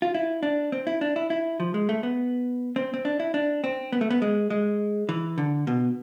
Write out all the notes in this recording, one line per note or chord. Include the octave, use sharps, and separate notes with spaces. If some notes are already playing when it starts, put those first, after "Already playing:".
F4
E4
D4
C4
E4
D4
E4
E4
F3
G#3
A3
B3
C4
C4
D4
E4
D4
C4
B3
A3
B3
G#3
G#3
E3
D3
B2